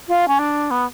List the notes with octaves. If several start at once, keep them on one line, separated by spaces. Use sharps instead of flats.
F4
C#4
D4
B3